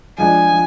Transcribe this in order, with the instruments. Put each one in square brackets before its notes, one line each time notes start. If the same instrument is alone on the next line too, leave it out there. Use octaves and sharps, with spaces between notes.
[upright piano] F3 G#3 D4 [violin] G#5
[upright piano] F3